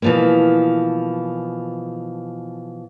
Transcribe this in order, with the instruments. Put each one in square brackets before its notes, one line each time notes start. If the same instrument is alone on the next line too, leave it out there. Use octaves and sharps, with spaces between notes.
[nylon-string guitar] B2 E3 F3 G#3 A#3